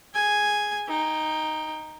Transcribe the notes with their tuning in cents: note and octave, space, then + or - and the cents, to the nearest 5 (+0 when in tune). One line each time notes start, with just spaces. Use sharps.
G#4 +0 G#5 +0
D#4 +0 G5 +20